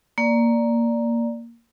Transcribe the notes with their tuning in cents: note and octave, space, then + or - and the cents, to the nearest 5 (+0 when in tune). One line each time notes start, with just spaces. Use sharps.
A#3 +0 D5 +0